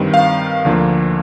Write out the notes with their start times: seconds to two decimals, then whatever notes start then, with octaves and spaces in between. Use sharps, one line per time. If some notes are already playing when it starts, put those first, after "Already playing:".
Already playing: G2 D#3 G3 C4
0.14 F5
0.65 D2 D3 F3 A#3